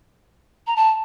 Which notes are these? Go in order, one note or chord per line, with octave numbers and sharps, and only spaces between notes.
A#5
A5